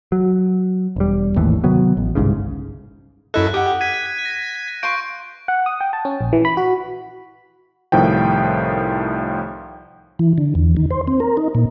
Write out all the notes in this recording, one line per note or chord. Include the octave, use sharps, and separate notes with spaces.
F#3
E1 G3
G#1 D#2 A2 E3
C3 D#3 F#3 B3
A1
G1 C2 G#2 C#3
F#2 E4 A4 D#5 F#6
G4 F#5 D#6
G#6 B6 D#7
A#6
F4 B4 C6 C#6 G6 D7
F#5
D#6
G5
A5
C#4
A#1
E3
B5
F#4
C2 A2 D#3 F3 G5
E3
D3
E2
D#3
C5
C4
A#4
D#4
A#2